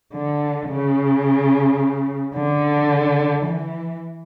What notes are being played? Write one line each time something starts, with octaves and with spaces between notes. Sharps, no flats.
D3
C#3
D3
E3